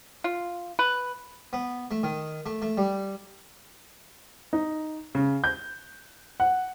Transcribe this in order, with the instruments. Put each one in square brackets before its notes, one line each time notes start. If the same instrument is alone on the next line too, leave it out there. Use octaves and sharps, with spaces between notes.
[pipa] F4
B4
[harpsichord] B3
A3
D#3
A3
A3
G3
[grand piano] D#4
C#3
G6
F#5